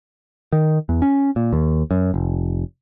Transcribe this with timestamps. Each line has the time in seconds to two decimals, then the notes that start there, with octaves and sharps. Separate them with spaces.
0.52 D#3
0.89 E2
1.02 C#4
1.36 A#2
1.53 D#2
1.91 F#2
2.14 F1